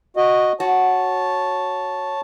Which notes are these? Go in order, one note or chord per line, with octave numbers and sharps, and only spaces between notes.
F#4 D#5
F#4 C#5 A5